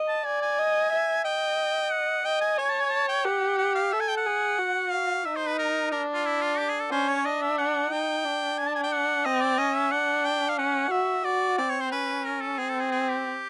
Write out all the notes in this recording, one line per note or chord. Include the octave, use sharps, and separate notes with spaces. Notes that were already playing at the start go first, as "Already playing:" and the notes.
Already playing: D#5
A5
D5 G#5
G#5
D#5
E5
D#5 G5
F#5
D#5 G5
G#5
C#5 G#5
A5
G#5
A5
G5
G4 F#5
F#5
F5
A4 E5
G#5
G5
F#5
G#4
F#4
F5
D#4 E5
C5
B4
A#4
D4 A#4
F4
E4
F4
G4
G#4
A4
C#4 C5
C#5
D4 D#5
E5
F#5
D#4 G5
D4
G#5
A5
G#5
G5
F#5
C4 D#5
D5
C#4 D#5
E5
D4 F#5
G5
F5
C#4 F#5
F#4 E5
F#4 D5
C4 D5
C#5
C5
C#4 B4
A#4
A4
C4 G#4
A4
G#4
G#4
G4